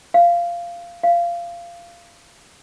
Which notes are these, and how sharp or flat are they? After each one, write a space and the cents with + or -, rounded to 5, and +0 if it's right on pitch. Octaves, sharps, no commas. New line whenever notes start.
F5 -15
F5 -20